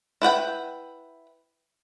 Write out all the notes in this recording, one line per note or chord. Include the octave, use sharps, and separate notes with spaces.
E4 B4 F#5 G5